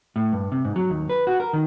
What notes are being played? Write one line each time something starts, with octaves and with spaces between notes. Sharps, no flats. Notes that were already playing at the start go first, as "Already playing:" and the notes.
A2
G2
C3
G#2
F#3
D#2
B4
F#4
A#4
D#3